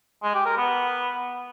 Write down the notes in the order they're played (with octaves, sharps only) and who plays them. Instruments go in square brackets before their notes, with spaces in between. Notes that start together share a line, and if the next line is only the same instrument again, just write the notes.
[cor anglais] G#3
G4
A#4
B3